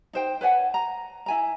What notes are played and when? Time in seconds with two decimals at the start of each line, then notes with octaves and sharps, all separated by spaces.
0.13 D#4 C5 G5
0.41 B4 C#5 F#5 G#5
0.74 A#5
1.26 E4 G#5 A#5